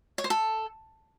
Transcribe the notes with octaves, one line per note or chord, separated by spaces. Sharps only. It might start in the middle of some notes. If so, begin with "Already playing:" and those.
C#5
C5
A4